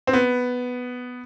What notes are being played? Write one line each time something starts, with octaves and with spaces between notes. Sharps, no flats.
C4
B3